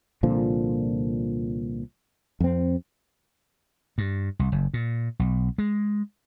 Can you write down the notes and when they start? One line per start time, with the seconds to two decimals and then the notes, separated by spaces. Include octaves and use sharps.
0.23 C2 A#2 D3 F3
2.40 F2 C4
3.98 G2
4.39 C2
4.52 F#1
4.74 A#2
5.19 B1
5.58 G#3